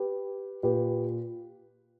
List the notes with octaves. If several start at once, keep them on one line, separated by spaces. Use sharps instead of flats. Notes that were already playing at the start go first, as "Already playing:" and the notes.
Already playing: G4 B4
A#2 G4 B4